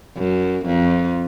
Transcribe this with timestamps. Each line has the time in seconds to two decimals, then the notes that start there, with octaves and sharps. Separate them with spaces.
0.17 F#2
0.66 F2